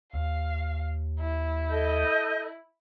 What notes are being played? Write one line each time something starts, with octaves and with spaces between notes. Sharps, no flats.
D#2 F5
E4
A4 D#5 G6